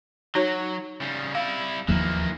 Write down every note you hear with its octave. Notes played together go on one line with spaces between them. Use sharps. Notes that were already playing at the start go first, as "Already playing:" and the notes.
F#3 D#4 F#4 C#5
C#3 G3
G3 E4 F5
D#2 E3 F3 A#3